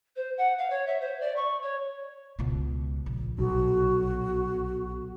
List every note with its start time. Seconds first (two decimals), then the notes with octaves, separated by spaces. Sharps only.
0.16 C5
0.38 F#5
0.58 F5
0.70 C#5
0.87 E5
1.01 C5
1.21 D5
1.36 C#6
1.62 C#5
2.39 C#2 B2
3.06 A#1
3.39 B1 F#4